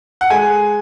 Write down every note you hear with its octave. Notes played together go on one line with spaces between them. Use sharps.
F#5
G#3 G#5